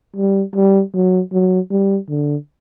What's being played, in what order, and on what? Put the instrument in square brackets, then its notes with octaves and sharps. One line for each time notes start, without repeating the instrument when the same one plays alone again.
[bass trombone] G3
G3
F#3
F#3
G3
D3